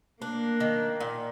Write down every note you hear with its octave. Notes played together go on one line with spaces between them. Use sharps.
A#3 D4
D#3
A#2